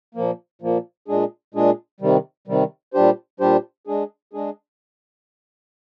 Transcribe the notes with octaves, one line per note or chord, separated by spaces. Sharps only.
A#2 F3 A#3
A#2 F3 A#3
A#2 G#3 D4 G#4
A#2 G#3 D4 G#4
C3 D#3 G3
C3 D#3 G3
A#2 G3 D4 G4 C5
A#2 G3 D4 G4 C5
G#3 D4 G#4
G#3 D4 G#4